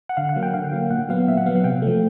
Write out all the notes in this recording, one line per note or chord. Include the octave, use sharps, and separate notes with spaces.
F#5
D3 F5
F#5
F#3 A#3
G5
D3 F5
F#3 A#3
A#2 F#5
F#3 B3 F5
A#2 E5
F#5
F#3 B3 F5
F#5
C3 G5
F3 A3